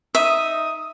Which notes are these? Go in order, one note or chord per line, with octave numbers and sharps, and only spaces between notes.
D#4 E5 D#6